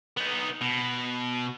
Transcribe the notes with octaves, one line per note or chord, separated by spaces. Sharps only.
B3 D#4
B2